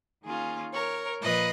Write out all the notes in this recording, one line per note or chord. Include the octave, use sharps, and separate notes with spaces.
D#3 A#3 C#4 F4 G#4
A#4 C#5
A#2 F3 B4 D#5